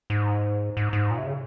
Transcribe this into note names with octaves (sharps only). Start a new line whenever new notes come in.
G#2
G#2
G#2
A#2
C3
C#3